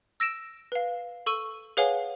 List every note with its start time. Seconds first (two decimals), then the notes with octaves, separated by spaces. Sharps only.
0.20 E6 A#6 D7 E7
0.72 B4 F5
1.26 A4 C#6 E6 D#7
1.77 G#4 B4 C#5 F5 F#5 G#5